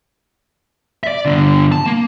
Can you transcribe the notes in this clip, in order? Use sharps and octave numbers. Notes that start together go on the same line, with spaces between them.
D5 E5
G2 D3
A5
A#3